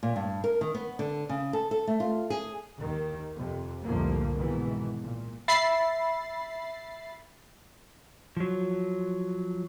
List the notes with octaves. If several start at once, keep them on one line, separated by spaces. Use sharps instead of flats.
A#2
G2
A#4
D#3
B3
D3
C#3
A4
A4
A3
F4
G#4
D#2 D#3
F2 C3
C2 F2 A2 D3 F3 A#3
G#2 B2 D#3 E3
A#2
E5 B5 A6 C7
F3 F#3